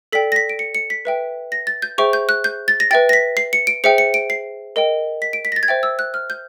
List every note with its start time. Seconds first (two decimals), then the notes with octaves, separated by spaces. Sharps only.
0.12 A4 D5 G5 B6
0.32 A#6
0.36 B6
0.49 D7
0.59 C#7
0.75 C#7
0.90 B6
1.05 B4 E5 G5
1.52 A#6
1.67 A6
1.82 G6
1.98 G#4 C5 E5 G5 C#6
2.13 G6
2.29 F#6
2.44 G6
2.68 A6
2.80 A#6
2.91 B4 E5 G5 A6
3.09 A#6
3.13 B6
3.37 C7
3.53 C#7
3.67 D7
3.84 G#4 C5 E5 G5 C#7
3.98 C#7
4.14 D7
4.30 C7
4.76 A#4 D#5 G5
5.22 B6
5.33 D7
5.45 B6
5.52 A#6
5.56 A6
5.63 G#6
5.68 C5 E5 G5 A6
5.83 E6
5.99 F#6
6.14 F6
6.30 G6